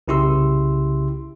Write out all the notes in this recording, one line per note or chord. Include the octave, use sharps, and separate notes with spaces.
C2 C#3 E4 G4 C6 E6